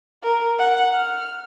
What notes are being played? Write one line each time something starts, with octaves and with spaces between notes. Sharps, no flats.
A#4
F#5
F6